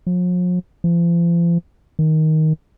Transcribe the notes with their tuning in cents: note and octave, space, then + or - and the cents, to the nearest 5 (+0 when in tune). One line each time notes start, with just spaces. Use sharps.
F3 +45
F3 -40
D#3 +10